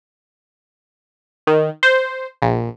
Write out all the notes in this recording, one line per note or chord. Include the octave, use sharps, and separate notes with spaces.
D#3
C5
A#1